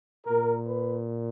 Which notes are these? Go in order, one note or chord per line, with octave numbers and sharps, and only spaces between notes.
A#2 A#4
B4